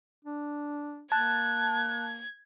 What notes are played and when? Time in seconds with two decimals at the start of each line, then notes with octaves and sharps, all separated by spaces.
0.25 D4
1.12 A#3 A5 F#6 G#6